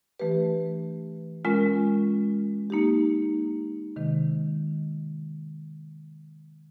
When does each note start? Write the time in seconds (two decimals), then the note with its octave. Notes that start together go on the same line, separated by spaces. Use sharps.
0.20 E3 A3 D4 G4 B4
1.45 G#3 C#4 F4 A#4
2.70 A#3 D#4 G4
3.96 C3 D#3 G#3